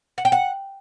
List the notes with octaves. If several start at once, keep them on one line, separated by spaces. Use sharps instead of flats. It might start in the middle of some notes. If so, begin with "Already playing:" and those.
F#5
G5
F#5